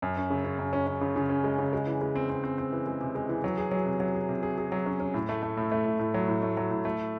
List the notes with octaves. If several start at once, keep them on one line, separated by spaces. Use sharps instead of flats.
F#2
C#4
C#3
C#4
F#2
C#4
C#4
C#3
C#3
C#4
G#3
C#3
G#3
E3
G#3
C4
C4
C4
C4
E3
G#3
C3
G#3
E3
F#3
G#4
F#3
C3
F#3
G#4
C3
G#4
G#4
F#3
C#4
C#4
A2
A3
A3
A2
A3
A2
A2
F#3
A2
A3
F#3
A2
A3